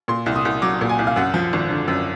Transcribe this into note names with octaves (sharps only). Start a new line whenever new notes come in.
A#2 C6
C2
D#6
C2
F#3 D6
A#2
G#5
C2
F5
F#2 F#5
F3
G#1
D3
F#2